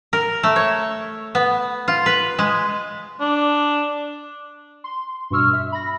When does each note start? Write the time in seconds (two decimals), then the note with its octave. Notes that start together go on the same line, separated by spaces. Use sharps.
0.13 A#4
0.43 A3
0.56 C#5
1.35 B3
1.88 F4
2.06 B4
2.39 G#3
3.21 D4
4.84 C6
5.30 G2 B2 C#6 E6 F6
5.53 E5
5.72 B5 A#6